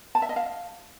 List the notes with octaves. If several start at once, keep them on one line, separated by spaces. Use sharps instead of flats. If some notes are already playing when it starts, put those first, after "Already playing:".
A5
E5
D#5
F5